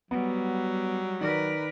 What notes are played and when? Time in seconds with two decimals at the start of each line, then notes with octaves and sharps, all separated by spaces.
0.11 F#3 G3 B3
1.21 D#3 A#4 B4 D5